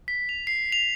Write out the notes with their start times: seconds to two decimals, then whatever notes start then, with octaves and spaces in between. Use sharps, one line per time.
0.08 B6
0.29 F7
0.47 C7
0.72 F7